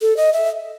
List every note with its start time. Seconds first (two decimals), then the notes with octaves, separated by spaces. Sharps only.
0.02 A4
0.17 D#5
0.33 E5